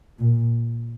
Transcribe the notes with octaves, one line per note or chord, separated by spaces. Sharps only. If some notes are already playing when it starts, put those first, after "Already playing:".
A#2